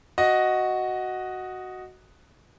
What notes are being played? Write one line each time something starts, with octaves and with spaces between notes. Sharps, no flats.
F#4 D#5